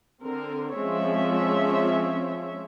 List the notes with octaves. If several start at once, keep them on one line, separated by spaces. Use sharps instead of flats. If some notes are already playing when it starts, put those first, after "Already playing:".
D3 C4 A#4
F3 G#3 C4 C#4 C#5 E5